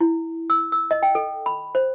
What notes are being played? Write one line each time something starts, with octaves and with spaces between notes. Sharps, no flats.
E4
E6
E6
D#5
G5
A4
B5
C5